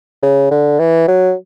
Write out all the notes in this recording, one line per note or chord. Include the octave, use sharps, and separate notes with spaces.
C#3
D3
E3
F#3